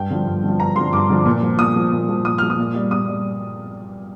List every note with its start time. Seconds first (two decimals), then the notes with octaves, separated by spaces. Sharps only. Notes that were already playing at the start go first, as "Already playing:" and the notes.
Already playing: G2 G5
0.10 D3 F3
0.26 G2
0.44 D3 F3
0.60 G2 A#5
0.76 D3 F3 C6
0.93 G2 D6
1.10 D3 F3
1.25 A#2
1.43 F3
1.59 A#2 D#6
1.76 F3
1.92 A#2
2.09 F3
2.25 A#2 D#6
2.38 F3 F6
2.50 D#6
2.58 A#2
2.75 G3
2.91 A#2 D#6
3.08 G3